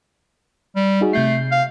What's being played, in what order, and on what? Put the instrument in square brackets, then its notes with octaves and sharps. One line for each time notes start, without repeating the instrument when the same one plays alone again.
[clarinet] G3
[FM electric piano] D#4 F#4 G#4
[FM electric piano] C3 G6 C7 [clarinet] A3
[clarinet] F5